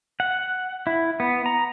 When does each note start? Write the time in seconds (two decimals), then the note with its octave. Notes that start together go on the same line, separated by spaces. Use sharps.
0.20 F#5
0.87 E4
1.20 B3
1.46 A#5